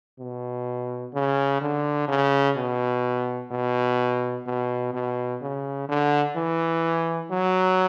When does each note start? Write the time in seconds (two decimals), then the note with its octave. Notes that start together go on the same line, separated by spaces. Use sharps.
0.19 B2
1.14 C#3
1.61 D3
2.08 C#3
2.57 B2
3.51 B2
4.46 B2
4.93 B2
5.41 C#3
5.89 D3
6.36 E3
7.31 F#3